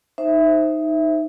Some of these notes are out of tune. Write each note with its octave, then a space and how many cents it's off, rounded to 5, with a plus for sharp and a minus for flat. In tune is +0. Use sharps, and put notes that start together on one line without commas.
D#4 +0 C5 +0 E5 +0